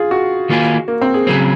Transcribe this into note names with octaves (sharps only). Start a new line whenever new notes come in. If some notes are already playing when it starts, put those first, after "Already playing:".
Already playing: F4 G#4
F#4
D#3 A#3 F4 G#4
A#3
C4
G#4
C#3 F#3 C4